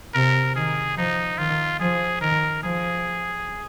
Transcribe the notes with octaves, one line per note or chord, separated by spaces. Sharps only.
C3 A#4
D#3 G#4
F3 D#4
D#3 F4
F3 G#4
D#3 A#4
F3 G#4